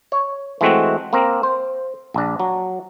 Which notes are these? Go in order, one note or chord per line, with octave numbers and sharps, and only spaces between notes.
C#5
E3 G#3 A3 C4 F#4
A#3 C4 A#4
C5
A#1 D4
F#3